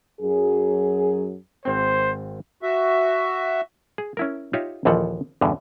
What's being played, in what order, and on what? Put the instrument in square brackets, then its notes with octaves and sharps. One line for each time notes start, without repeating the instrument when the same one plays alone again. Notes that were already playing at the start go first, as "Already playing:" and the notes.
[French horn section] F#2 F#3 G#4
[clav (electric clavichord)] G#1 C4 [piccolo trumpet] C5
[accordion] F#4 E5
[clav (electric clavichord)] G#4
C#4 E4 A#4
D#4 F4 G4 C#5 E5
A#1 D#2 E3 F3 A4 F#5
E2 G2 B2 D3